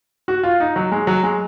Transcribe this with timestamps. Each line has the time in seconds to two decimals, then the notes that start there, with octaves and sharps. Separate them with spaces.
0.28 F#4
0.43 F4
0.60 D#4
0.76 F#3
0.92 G#3
1.07 F#3
1.23 G#3